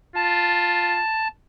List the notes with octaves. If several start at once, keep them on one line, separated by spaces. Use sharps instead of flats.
F4 A5